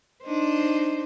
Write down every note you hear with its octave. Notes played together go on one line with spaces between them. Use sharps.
D4 D#4 C5